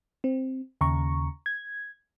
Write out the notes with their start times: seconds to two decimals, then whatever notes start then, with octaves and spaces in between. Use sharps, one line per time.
0.24 C4
0.81 D#2 C#3 A#5 C#6
1.46 G#6